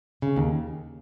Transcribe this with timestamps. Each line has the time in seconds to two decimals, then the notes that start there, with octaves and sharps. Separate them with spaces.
0.22 C#3
0.37 D#2